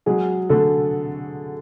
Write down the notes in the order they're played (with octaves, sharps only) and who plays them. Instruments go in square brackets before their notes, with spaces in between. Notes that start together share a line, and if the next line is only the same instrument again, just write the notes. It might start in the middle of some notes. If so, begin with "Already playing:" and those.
[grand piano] F#3 G#3 G#4
D3 A3 A4